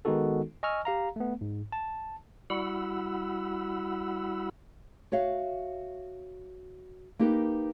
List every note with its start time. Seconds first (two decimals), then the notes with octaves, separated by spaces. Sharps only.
0.05 D#3 G#3 B3 D#4 F#4 A4
0.63 D#5 G#5 C#6 E6 F6
0.85 G4 F5 A#5
1.16 A3 B3
1.41 G#2
1.72 A5
2.50 G3 E4 F#4 F#5 B5 E6
5.12 F#4 C#5 E5 F5
7.19 A#3 D#4 G4 A#4 B4